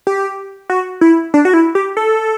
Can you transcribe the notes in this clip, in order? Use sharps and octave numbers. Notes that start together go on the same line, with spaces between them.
G4
F#4
E4
D4
F#4
E4
G4
A4